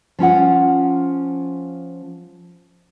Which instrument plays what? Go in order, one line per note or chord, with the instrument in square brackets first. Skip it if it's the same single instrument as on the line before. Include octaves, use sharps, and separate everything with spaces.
[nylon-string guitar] F3 C#4 F4 F#5